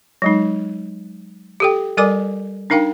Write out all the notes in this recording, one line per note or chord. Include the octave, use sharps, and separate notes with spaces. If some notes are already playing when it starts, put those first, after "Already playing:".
F#3 G#3 D#4
G4 A4 G5
G3 A4 A#4 D5 G#5 D6
D4 D#4 A#4 F5 G5